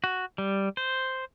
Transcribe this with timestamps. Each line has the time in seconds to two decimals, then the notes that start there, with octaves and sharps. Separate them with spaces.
0.04 F#4
0.38 G3
0.77 C5